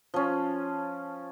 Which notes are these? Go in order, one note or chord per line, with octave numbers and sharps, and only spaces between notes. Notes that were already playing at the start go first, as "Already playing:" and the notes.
F3 C#4